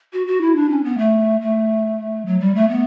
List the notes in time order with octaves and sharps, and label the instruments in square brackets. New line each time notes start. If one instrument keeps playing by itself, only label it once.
[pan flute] F#4
F#4
E4
D4
C#4
B3
A3
A3
F#3
G3
A3
B3